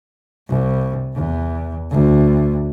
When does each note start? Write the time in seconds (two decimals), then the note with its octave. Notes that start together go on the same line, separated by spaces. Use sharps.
0.48 C2
1.14 E2
1.91 D2